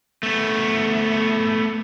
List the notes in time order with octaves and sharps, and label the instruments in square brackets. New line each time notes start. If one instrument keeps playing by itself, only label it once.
[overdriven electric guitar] A3 B3